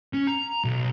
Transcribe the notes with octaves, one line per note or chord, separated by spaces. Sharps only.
C#4
A#5
B1